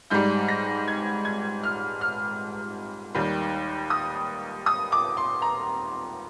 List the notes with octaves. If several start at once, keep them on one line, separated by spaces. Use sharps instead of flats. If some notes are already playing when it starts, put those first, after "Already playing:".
G#2 G3 G6
A#6
G#6
G#6
F6
F6
D#2 D#3 G3
D#6
D#6
D6
C6
A#5